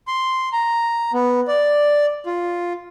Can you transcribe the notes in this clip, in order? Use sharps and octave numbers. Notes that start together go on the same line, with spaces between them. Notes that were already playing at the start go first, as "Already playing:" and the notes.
C6
A#5
B3
D5
F4